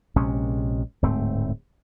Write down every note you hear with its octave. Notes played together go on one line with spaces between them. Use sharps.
A#1 C3 G#3 C#4
D1 G#2 A3 C4